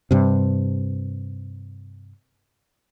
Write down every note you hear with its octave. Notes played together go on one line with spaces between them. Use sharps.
G2 C3